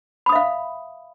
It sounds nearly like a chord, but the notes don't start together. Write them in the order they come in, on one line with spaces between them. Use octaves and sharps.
B5 D#6 E5 F5